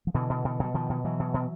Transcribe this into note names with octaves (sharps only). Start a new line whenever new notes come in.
F3
B2 D3 E3
B2
B2
B2 F#3
B2 D#3 F3
B2
B2 E3 F#3
B2
B2